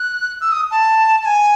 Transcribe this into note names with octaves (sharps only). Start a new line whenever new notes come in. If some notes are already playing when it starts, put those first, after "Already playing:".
Already playing: F#6
E6
D#6
A5
A5
G#5